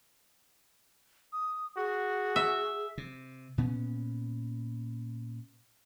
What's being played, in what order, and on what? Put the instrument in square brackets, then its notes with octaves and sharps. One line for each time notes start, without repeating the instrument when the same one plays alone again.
[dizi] D#6
[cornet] F#4 [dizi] G#4
[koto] E5
[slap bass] C3
A#2 B3 C#4